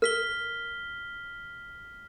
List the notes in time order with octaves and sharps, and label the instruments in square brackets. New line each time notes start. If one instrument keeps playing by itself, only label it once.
[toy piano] A#4 [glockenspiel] F6 B6 G7